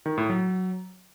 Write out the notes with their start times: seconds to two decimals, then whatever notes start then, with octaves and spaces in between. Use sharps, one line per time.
0.06 D#3
0.18 A2
0.30 F#3